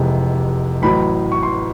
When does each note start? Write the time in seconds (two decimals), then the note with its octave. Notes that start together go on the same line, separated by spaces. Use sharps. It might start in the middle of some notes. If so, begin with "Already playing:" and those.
Already playing: F1 F2 C3 E3 G#3
0.82 A1 A2 F#3 B5
1.32 C#6
1.43 C6